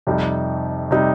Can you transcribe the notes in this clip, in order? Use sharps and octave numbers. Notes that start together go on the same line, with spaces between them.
F2 C3 G3 D#4
C3 G3 D#4